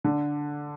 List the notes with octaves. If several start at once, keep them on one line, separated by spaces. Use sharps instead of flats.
D3